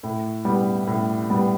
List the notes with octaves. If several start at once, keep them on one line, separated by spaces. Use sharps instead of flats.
A2
G3 B3
A2
G3 B3